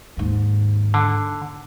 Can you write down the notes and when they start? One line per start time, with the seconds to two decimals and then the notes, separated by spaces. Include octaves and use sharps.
0.17 D#2 G#2
0.94 D3